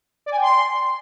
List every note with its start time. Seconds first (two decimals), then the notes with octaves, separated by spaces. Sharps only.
0.26 D5
0.32 G#5
0.37 G5
0.42 C6